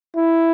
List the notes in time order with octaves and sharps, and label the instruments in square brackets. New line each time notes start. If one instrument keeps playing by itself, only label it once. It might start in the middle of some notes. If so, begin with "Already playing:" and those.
[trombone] E4